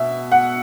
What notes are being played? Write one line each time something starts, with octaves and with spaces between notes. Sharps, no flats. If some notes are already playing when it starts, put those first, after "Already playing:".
Already playing: B2 E5
F#5